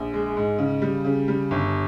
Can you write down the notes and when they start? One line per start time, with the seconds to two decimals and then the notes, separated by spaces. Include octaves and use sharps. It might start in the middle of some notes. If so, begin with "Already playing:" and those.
Already playing: A#1
0.13 G#3
0.37 G#2
0.58 C#3
0.82 G3
1.05 C#3
1.28 G3
1.51 G1